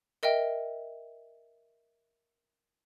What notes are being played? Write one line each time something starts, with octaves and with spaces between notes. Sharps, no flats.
A#4 D#5 E5 G5